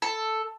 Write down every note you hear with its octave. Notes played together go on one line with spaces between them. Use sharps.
A4